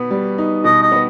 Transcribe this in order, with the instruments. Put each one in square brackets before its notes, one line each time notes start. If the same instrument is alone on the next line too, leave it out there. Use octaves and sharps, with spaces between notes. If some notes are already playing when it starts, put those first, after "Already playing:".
Already playing: [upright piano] B2 B3
G3
D#4
[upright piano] B2 [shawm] D#5
[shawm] D#5
[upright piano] B3